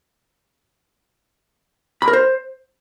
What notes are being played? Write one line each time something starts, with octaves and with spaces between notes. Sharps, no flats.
B5
A#4
C5